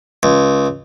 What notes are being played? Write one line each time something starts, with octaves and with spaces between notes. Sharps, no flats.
C#2